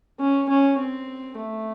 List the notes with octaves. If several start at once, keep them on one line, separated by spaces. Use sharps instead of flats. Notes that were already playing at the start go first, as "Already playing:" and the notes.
C#4
C#4
C4
A3